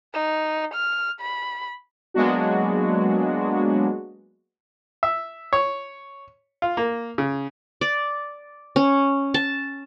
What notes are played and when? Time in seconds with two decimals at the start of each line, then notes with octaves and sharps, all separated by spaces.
0.14 D#4
0.74 F6
1.20 B5
2.14 F#3 G#3 A#3 B3 D4 F#4
5.03 E5
5.53 C#5
6.62 F4
6.77 A#3
7.18 C#3
7.81 D5
8.76 C#4
9.34 A5